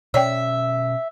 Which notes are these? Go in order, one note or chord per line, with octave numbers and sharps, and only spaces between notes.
B2 C#4 C#5 D5 E5 G5